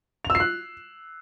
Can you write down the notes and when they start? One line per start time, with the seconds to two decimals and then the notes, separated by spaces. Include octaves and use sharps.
0.25 F7
0.30 E6
0.35 C7
0.40 F#6